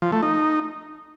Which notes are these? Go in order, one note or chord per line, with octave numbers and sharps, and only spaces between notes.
F3
A3
D#4